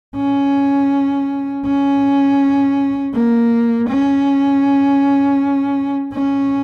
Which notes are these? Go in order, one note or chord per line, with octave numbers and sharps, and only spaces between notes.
C#4
C#4
A#3
C#4
C#4